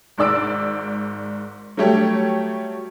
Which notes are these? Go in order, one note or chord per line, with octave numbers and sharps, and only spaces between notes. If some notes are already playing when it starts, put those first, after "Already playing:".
G#1 G#2 D5 E6 D7
F#3 G3 A3 G4 C#5